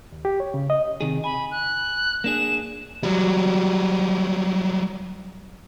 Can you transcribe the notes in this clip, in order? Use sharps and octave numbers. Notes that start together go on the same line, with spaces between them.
D#2
G4
C#5
C#3
D#5
C3 D#3 G#4
G#5 B5
F#6
A#3 D4 G#4 E7
F#3 G3